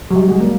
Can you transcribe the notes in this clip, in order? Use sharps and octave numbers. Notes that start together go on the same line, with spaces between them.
F#3
G3
G#3
A#3